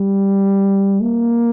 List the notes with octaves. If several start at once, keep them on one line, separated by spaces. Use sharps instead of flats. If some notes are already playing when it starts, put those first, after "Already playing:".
Already playing: G3
A#3